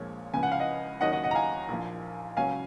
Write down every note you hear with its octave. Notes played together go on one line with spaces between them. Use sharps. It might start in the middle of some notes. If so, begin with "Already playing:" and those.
Already playing: A#1 A#2 F3 G#3 C4 C#5
C#2 C#3 F3 G#5
F#5
F5
D#5 F#5
D#2 D#3 F#3 C#4 D#5 F#5
D#5 F#5
D#5 F#5
A#5
F5 G#5
A#1 A#2 F3
C#2 C#3 F#3 C#4 F5 G#5